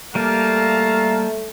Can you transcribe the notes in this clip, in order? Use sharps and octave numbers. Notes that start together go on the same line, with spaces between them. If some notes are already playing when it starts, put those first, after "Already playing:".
G3 A3 A#3 F5 A5 A#5